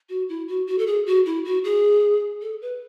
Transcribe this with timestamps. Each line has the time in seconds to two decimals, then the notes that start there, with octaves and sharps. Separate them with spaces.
0.09 F#4
0.29 E4
0.48 F#4
0.67 F#4
0.78 A4
0.87 G#4
1.07 F#4
1.26 E4
1.45 F#4
1.64 G#4
2.42 A4
2.62 B4